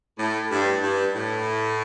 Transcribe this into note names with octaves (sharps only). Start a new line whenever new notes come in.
A2
G2
G2
A2